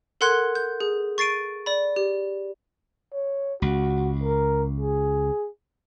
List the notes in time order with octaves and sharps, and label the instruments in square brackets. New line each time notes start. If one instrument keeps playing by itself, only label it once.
[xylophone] A4 A#4 F#5 C6 F#6 G#6
G6
G#4
C#6 A6 C7 D7 D#7
D5 B5
G4
[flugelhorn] C#5
[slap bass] C#2 [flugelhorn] F#4
[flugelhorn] A#4
G#4